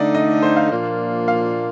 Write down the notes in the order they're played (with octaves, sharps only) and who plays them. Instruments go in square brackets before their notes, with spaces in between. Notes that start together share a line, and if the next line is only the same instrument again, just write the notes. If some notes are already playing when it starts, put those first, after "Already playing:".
Already playing: [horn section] D3 A3 D#4 [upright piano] D5 D#5
[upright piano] D#5
C5
F5
[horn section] A#2 F3 A#3 D4 F4
[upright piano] F5